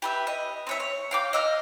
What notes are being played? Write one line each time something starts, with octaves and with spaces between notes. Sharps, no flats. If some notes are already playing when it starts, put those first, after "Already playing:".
G4 B4 E5
D#5
C4 C#5 E5
C#5
F5 G5 D6
D#5 E6 F6